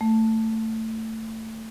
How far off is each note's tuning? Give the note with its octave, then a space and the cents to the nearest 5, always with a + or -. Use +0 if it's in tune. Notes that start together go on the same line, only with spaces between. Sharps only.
A3 +20